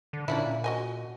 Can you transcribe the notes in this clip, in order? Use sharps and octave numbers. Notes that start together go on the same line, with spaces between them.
D3
A#2 C#4 D4 E4
F#4 D#5 G#5